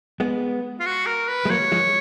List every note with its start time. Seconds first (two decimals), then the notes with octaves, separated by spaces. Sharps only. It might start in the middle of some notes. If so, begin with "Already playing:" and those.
0.20 G#3 B3
0.80 F4
0.86 F#4
1.06 A#4
1.28 B4
1.45 G#3
1.50 F#3 A#3 C#5
1.72 F3 G#3